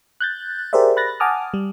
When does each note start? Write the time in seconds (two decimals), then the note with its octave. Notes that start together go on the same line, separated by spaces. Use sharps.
0.20 F#6 G6 A6
0.73 G4 G#4 A#4 C5 D5 E5
0.97 B5 F#6 A6 A#6
1.20 F#5 G#5 A5 D6 D#6 F6
1.54 G3